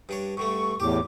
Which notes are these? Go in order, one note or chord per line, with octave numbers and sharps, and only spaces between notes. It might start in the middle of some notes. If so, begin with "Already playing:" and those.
G2 D4 C#5
G2 D3 A3 C#6
E2 A2 G4 D6